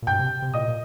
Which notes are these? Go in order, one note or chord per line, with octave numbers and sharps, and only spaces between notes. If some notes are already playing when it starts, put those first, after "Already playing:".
A#2
G2 G5 G6
C3
C3
A#2 D#5 D#6
A#2